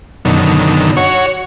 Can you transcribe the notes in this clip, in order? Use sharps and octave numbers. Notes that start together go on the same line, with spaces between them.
F#2 B2 D3 D#3
F#4 C#5